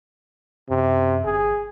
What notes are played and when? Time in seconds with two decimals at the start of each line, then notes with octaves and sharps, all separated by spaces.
0.70 F#2 C3
1.25 G1 G#4